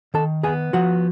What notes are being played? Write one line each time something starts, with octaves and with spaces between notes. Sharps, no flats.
D#3 A4 A5
B3 G#4 G#5
F3 F#4 F#5